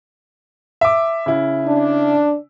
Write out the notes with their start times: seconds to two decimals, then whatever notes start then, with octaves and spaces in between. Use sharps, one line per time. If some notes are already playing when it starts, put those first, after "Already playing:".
0.81 E5 D6
1.26 C#3 E4
1.66 D4